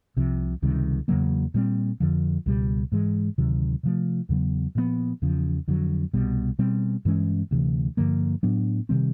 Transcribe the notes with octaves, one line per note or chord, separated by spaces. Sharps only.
C2 C3 F3
C#2 C3 D#3 G3
E2 C#3 F#3 A#3
A#2 G3 C4
F2 D3 F3
C#2 B2 G3
G#2 E3 G#3
D2 C3 D#3 F#3
C3 F3 A3
E2 C#3 F#3 B3
A#2 F3 G#3 B3
E2 C#3 F3
F2 D3 F#3
C2 B2 G3
B2 G3 C4
G2 E3 G#3 C#4
D2 C3 E3
G2 D3 F3 A#3
A2 F#3 B3 D4
C3 D#3 G3 C4